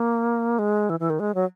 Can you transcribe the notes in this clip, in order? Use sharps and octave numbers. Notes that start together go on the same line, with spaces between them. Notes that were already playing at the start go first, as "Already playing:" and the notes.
Already playing: A#3
G#3
E3
E3
D#3
G#3
F#3